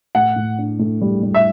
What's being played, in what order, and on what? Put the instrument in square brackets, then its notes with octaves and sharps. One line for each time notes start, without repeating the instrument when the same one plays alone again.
[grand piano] A2 [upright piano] F#5
[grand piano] A2
D4
A2
G3
G3
[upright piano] E5